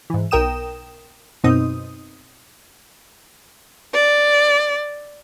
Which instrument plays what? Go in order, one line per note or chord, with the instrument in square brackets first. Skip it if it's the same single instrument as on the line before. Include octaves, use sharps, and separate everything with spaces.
[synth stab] G#2 E3
B1 A#4 G5 D#6 E7
F#2 B2 C4 D#4 D#6
[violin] D5